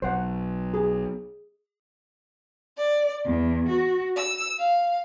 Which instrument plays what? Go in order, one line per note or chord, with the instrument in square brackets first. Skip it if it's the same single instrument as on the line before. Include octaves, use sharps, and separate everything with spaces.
[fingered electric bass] B1 [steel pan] C5 F#5
[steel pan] G#4
[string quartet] D5
E2
F#4
E6
F5